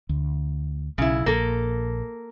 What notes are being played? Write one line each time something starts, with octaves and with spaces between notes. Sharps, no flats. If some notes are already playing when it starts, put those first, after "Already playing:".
D2
B1 C#3 E4
A#1 A#3 A4